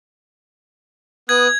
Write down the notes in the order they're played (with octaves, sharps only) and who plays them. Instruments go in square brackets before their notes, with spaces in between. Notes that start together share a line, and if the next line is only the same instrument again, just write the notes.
[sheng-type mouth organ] B3 D#6 F#6 [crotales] G#6